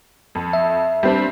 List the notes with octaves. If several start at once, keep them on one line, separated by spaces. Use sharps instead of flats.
F2
E5
G3 C4 D4